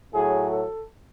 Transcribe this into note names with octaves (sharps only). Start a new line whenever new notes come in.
A2 F#3 G#4
A4